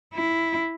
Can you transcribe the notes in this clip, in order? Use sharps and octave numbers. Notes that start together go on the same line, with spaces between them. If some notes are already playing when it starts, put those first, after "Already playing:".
E4